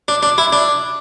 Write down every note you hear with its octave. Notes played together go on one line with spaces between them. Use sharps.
D4
D4
E4
D4